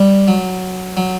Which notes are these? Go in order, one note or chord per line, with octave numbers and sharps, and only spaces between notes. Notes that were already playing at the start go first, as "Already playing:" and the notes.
Already playing: G3
F#3
F#3